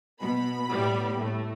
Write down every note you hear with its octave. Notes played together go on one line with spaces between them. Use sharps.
B2 B3 B5
A2 G3 B3
A2 A3